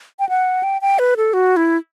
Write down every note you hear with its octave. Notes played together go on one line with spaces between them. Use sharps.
G5
F#5
G5
G5
B4
A4
F#4
E4